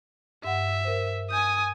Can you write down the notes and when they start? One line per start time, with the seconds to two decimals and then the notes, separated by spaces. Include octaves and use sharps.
0.45 G2 E5 F#5
0.84 A#4 C5
1.31 G#5 D#6 G6